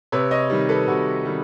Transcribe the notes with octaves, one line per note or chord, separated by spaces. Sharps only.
C3 B4 C#5
C#5 D#5
D#3 G3
A4 B4
C3 F#4
D#3 G3